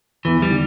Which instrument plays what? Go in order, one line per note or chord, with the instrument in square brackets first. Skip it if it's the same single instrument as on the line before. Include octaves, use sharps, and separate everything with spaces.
[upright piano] E2 [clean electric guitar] E3
[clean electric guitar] G3
[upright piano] D#3